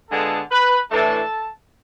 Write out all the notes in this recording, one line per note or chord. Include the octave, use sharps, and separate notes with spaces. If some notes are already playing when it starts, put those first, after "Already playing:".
D3 G#3 B3 F4 A4 A5
B4 B5
A2 E3 A3 D4 A4 A5